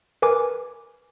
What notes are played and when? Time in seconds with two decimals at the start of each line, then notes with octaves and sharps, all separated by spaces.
0.22 A#4 B4 G#5 D6